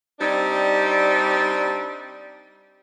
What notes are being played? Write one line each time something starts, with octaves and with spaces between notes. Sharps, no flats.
G3 C4 D4 D#4